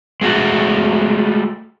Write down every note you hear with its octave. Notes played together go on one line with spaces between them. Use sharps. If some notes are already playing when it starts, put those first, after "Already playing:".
G#3 A3 F#4